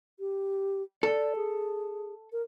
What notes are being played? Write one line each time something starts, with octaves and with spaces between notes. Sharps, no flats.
G4
A4 D5
G#4
A#4